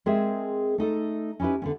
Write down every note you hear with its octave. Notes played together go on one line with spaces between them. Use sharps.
G#3 C4 G#4 A#4 C5 E5
A3 D#4 A4
C#4 D#4 E4 G4 B4
D3 B3 C#4